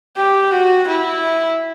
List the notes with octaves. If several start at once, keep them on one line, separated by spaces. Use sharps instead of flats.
G4
F#4
E4